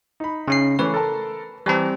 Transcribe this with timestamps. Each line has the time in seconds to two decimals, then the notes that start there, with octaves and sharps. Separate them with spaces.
0.20 D#4 B5
0.48 C#3 C#4 C7
0.79 E3 A3 C#4 B4
0.94 A4 A#4 A5
1.66 E3 G3 C4 A5 A#5